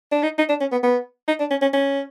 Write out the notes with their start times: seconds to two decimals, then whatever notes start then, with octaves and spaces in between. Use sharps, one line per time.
0.12 D4
0.23 D#4
0.38 D#4
0.49 D4
0.61 C#4
0.72 B3
0.83 B3
1.28 D#4
1.40 D4
1.51 C#4
1.62 C#4
1.73 C#4